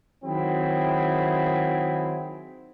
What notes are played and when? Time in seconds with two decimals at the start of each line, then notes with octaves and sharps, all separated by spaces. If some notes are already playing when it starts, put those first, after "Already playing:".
0.25 D#3 F#3 C4 E4 G#4